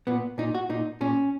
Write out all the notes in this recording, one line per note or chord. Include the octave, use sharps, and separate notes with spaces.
A#2 B3
A#2 D#4
F#4
A#2 D#4
A#2 C#4